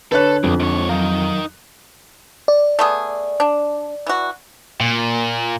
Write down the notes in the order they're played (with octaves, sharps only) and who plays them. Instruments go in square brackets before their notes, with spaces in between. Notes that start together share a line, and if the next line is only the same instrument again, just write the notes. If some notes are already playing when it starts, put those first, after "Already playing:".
[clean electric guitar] D3 D4 [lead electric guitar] A4 [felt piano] B4 C#5 F#6
[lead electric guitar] B1 [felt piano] F2
[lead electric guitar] G#2 C#5
[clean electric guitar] D#2 F#3 F5 [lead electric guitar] D#4 A#4
[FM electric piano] D5
[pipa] A3 B3 G#4
D4
E3 F#4
[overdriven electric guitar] A#2